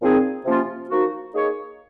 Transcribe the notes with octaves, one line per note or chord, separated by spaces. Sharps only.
A#2 F3 C4 D#4 G#4
C3 F3 A#3 C#4 F4
F3 A#3 D#4 F#4
A#3 D#4 G#4 C#5